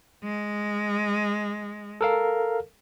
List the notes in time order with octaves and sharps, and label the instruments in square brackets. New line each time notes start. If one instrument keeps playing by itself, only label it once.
[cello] G#3
[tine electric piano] A4 A#4 F5